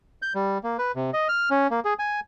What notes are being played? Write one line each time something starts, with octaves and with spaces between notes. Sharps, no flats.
G6
G3
A#3
B4
C3
D#5
F6
C#4
A#3
G#4
G#5